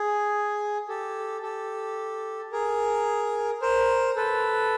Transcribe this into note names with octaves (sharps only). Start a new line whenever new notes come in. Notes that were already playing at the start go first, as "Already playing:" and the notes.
Already playing: G#4
G4 A4
G4 A4
G#4 A#4
A#4 C5
A4 B4